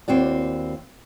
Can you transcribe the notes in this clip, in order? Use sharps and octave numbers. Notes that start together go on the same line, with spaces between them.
D#2 C4 E4 F#4 D5